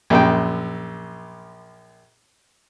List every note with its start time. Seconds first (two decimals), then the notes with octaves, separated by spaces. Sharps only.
0.10 A#1 F#2 G5